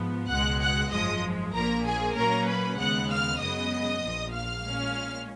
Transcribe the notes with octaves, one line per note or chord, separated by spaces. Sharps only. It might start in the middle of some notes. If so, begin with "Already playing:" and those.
Already playing: G#2 F3 B3
C#2 B2 G#3 F#5 F#6
F#5 F#6
G#1 F#2 F3 G#3 D#5 D#6
A#1 A#2 F3 A#3 A#4 A#5
G#4 G#5
A#2 F#3 A#3 C#4 A#4 A#5
B4 B5
D#2 C#3 G#3 B3 F#5 F#6
F5 F6
F#2 C#3 G#3 B3 D#5 D#6
A#1 A#2 F3
F5 F6
A#2 G#3 C#4